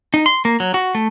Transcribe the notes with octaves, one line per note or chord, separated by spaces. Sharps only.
D#4
C6
A#3
F#3
F#4
A3